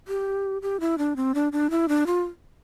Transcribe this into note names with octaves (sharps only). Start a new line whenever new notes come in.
G4
G4
E4
D4
C4
D4
D4
E4
D4
F4